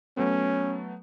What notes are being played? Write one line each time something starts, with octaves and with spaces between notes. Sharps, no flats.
F#3 A3 B3 C#4